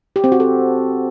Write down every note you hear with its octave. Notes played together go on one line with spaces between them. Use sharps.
G4
C4
F#4
A4